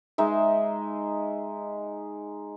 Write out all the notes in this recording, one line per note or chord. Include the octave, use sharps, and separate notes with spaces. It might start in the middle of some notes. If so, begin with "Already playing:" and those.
G#3 D#4 E5